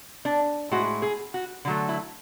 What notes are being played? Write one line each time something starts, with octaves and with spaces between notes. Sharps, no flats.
D4
A2 G#3 F#4
G#4
F#4
D3 F#3 A3
E4